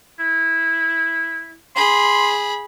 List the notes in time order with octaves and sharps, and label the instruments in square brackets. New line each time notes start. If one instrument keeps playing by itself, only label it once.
[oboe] E4
[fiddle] G#4 B5 [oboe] C6